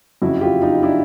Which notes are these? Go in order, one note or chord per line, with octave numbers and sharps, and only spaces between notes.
F#1 F2 C#3 E4 F#4
F4 G4
D#4 F4
D4 E4